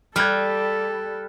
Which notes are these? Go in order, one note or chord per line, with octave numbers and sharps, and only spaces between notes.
G3 A4 F6 F#6 G#6